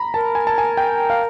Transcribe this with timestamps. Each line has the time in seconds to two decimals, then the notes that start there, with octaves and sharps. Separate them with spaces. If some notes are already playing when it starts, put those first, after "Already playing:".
Already playing: A#5 B5
0.14 A#4 A5
0.35 G#5
0.47 A5
0.58 G#5
0.77 G5
1.10 F5